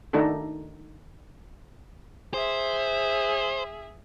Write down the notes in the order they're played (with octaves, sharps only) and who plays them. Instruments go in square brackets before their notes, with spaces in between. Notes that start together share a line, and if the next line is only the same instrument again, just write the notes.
[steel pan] D#3 A3 D4 D#4 F#4 A4
[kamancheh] G#4 E5 [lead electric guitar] C5